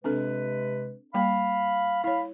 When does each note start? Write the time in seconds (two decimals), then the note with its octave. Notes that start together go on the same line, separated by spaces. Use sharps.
0.04 C3 G#3 C4 D4 A4 B4
1.14 G3 A#3 F5 G5 B5
2.04 E4 C#5 F5 B5